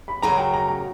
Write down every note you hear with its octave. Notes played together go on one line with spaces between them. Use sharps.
B5
F#2 C#3 F#3 A#5
G5
A#5
A#5